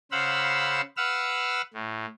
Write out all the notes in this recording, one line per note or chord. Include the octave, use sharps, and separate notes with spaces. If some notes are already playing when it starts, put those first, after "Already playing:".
C#3 C5 F5 F#5 B5 E6
B4 F5 F#5 E6 F6
A2